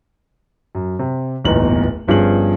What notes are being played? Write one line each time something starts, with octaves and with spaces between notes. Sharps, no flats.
F#2
C3
D1 G1 E2 A#2 D#4 F#7
G1 G2 F3 C#4 G#4 F#7